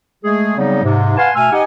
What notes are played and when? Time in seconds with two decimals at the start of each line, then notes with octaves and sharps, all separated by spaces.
0.24 G#3 A3 G#4
0.57 C#3 F#3 G3 B3 C4 D#4
0.84 G#2 C3
1.17 B4 F5 F#5 G#5 A5 C6
1.36 B2 A3 G#5 E6 F6
1.52 D#4 G4 D#5 F#5 G#5